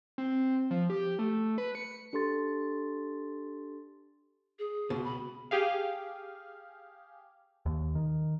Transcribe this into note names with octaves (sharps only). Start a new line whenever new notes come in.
C4
F3
G4
A3
B4
C#7
D4 G4 A4 C6 A6
G#4
C#2 B2
B5
G4 G#4 F5
D#2
D#3